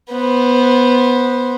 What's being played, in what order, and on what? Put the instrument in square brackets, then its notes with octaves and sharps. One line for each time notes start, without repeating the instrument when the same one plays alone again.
[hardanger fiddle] B3 C5